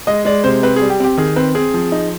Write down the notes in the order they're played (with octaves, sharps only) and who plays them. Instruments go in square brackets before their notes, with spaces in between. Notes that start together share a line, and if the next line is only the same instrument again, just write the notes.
[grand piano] G#3 D#5
G#3 D5
C3 C5
C4 B4
G#4
G3
G4
C4 G4
D#3 G#4
C4 B4
C4 G#4
F3
D#4